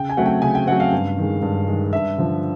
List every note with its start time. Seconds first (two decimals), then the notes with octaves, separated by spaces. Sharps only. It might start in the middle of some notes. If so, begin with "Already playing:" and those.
Already playing: C#3 G5
0.09 G#5
0.17 F#3 A3 C4 F#5
0.26 G5
0.42 C#3 G#5
0.55 G5
0.67 F#3 A3 C4 F#5
0.80 F5
0.92 G2
1.17 D#3 G#3
1.42 G2
1.68 D#3 G#3
1.93 G2 E5
2.18 D3 F3